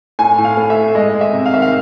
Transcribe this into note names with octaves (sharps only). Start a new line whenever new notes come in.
A2 G#5
A2
F5
A3
E5
A3
G#3 D#5
G#3
E5
C3
F5
D#3 E5
F5